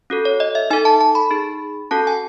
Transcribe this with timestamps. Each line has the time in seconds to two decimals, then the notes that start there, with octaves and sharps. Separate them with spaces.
0.10 C#4 F#4 A4
0.25 C#5
0.40 D#5
0.55 E5
0.70 D#4 A4 G#5
0.85 A5
1.01 A5
1.15 B5
1.31 D#4 G#4
1.91 C#4 F#4 A4 A5
2.07 G#5